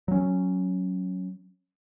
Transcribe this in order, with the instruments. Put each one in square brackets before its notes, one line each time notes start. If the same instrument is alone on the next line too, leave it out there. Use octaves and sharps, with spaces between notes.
[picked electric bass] F#3 C#4